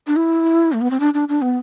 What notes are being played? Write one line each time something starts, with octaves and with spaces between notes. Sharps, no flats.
D4
E4
A3
B3
C4
D4
D4
D4
B3